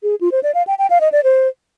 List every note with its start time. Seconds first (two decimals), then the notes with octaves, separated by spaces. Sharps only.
0.03 G#4
0.21 F4
0.32 C5
0.43 D5
0.55 F5
0.67 G5
0.78 G5
0.90 F5
1.01 D#5
1.12 D5
1.24 C5